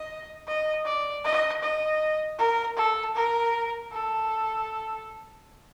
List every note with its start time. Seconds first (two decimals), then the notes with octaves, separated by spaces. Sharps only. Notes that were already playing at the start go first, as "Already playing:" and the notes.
Already playing: D#5
0.48 D#5
0.86 D5
1.25 D#5
1.62 D#5
2.39 A#4
2.77 A4
3.16 A#4
3.92 A4